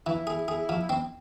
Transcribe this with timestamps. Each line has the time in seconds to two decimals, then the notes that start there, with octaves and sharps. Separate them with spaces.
0.06 E3 E4
0.27 G#4
0.48 G#4
0.69 F3
0.89 C4